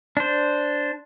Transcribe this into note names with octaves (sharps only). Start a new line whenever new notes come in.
D4 C5